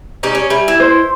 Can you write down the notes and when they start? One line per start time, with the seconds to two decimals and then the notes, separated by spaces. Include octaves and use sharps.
0.23 G3 C#4 D#4
0.35 C#4
0.50 G3 E5 G#5
0.68 E4
0.80 C5 C6